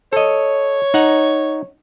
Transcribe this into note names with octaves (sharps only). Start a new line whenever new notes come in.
A4 C#5 D#5
D#4 F#5 A#5